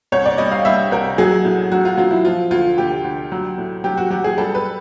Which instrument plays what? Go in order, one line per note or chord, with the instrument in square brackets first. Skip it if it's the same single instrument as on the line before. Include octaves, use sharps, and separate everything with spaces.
[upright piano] C2 C#5
D5
G3 D#5
F5
G3 E5
C2 A#4
F#3 G#4
A2
F#3 F#4
F4
F#3 F4
E4
F3 F4
D2 F4
D2 G4
D2
F#3
A2
F#3 G4
F#4
F#3 G4
G#4
G3 A4
B4